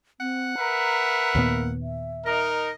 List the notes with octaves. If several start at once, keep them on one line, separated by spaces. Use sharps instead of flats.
C4 F#5
A#4 B4 E5 A#5
D#2 A#2 A#3 B3
E5
D#4 A#4 D#5